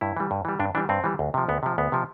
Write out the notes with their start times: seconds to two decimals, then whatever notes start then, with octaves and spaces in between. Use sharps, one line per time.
0.01 G2 E4
0.17 E3 G3
0.31 G2
0.45 E3 G3
0.60 G2 D4
0.75 E3 D4
0.78 G3
0.89 G2 C4
1.04 E3 G3
1.19 D2
1.34 C3 F3
1.48 D2 B3
1.63 C3 F3
1.78 D2 B3
1.92 C3 F3